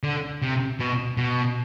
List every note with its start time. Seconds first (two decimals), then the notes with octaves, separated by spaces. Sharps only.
0.03 D3
0.42 C3
0.80 B2
1.17 B2